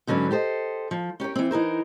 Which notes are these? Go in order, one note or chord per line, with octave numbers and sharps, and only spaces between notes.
G#2 D3 F#3 C#4 B4
G4 A4 C5 D#5
F3
C#4 G4 A#4 C#5
E3 C4
E3 D#4 A#4 C5